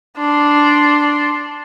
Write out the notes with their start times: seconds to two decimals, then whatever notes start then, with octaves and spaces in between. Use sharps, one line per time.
0.18 D4 C6